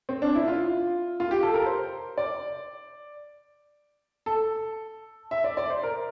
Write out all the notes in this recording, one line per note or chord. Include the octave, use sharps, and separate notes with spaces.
C4
D4
E4
F4
F4
G4
A4
A#4
C5
D5
A4
E5
D5
D5
C5
A#4